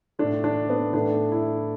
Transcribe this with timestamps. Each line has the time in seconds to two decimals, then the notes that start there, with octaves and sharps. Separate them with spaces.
0.19 A3 D4
0.24 A2
0.44 D4
0.69 B3
0.94 A2 A3 D4
1.32 E4